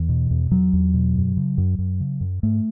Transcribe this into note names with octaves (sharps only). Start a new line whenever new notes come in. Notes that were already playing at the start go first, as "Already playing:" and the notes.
Already playing: E2 E3
B2
E2
E2 F#3
E2
B2
F#2
C#3
F#2
F#2
C#3
F#2
G#2 A3